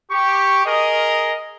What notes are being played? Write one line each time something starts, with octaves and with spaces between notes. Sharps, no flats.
G4 C#6
G#4 A#4 D#5